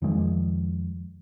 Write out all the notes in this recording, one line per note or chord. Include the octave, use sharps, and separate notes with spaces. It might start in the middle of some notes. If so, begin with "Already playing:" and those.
F2 D#3 F3 G#3